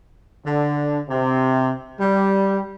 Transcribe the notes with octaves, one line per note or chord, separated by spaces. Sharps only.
D3
C3
G3